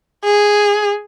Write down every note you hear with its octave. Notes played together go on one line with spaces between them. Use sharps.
G#4